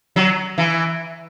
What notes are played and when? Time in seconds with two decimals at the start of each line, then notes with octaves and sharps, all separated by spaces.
0.16 F#3
0.58 E3